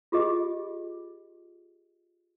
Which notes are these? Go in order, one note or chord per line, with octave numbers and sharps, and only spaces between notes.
F4 G4 G#4 D#5